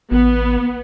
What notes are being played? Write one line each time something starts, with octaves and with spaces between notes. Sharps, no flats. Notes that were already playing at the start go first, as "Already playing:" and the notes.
A1 B3